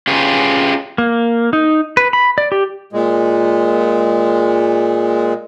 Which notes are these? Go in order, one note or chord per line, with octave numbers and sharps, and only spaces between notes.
C#4 F4 G4 G#4 B4
A#3
D#4
B4
B5
D5
G4
A#2 G#3